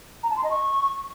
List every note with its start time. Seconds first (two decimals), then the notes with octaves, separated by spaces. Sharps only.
0.23 A#5
0.30 A5
0.37 C6
0.43 D#5
0.50 C#6